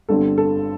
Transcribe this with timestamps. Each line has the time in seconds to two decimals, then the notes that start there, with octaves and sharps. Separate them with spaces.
0.09 G1 G2 D3 G3 C4 A4
0.38 A4